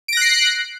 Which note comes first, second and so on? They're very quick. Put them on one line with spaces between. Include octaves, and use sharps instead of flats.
D7 A#6 F#6 C7